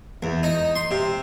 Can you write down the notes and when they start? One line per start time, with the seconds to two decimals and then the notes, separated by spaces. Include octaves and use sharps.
0.23 E2
0.43 D#4
0.75 C6
0.91 C3